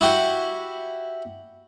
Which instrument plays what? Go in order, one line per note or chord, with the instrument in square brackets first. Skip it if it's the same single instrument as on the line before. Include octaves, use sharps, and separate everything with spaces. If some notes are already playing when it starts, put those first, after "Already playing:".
[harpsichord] E4 F#4 G4 F#5